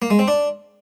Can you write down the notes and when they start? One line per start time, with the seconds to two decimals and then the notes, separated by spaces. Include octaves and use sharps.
0.02 A#3
0.10 G#3
0.19 C4
0.28 D4